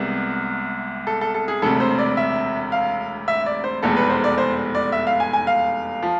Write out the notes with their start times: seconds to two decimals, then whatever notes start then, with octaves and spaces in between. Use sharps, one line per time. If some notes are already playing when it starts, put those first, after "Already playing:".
Already playing: C2 C3 G#3 B3
1.07 A4
1.21 A4
1.34 A4
1.48 G#4
1.62 E1 D2 C3 A4
1.80 C5
1.99 D5
2.17 E5
2.72 F5
3.28 E5
3.46 D5
3.64 C5
3.83 F1 E2 B2 G#3 A4
3.97 B4
4.09 C5
4.24 D5
4.38 C5
4.75 D5
4.92 E5
5.07 F5
5.20 G#5
5.33 G#5
5.47 F5
6.03 F3